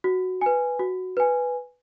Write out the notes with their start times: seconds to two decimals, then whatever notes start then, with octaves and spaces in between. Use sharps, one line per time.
0.04 F#4
0.41 B4 G#5
0.80 F#4
1.17 B4 G#5